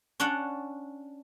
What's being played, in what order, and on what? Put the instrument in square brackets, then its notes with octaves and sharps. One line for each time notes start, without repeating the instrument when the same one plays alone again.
[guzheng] C#4 D4 D5 F#5